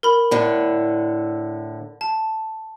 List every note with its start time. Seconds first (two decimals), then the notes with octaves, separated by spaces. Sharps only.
0.03 A#4 B5
0.31 A2 D3
2.01 A5